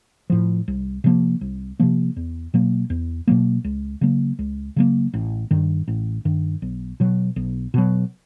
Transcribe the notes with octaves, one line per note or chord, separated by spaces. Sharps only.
A2 F3
C2
C3 F3 A#3
C2
C3 F3 A#3
E2
B2 F#3 A#3
E2
B2 F#3 A#3
C#2
C#3 F#3 A#3
C#2
C#3 F#3 A#3
A1
G2 D#3
A1
G2 D#3
B1
B2 F#3
B1
B2 F#3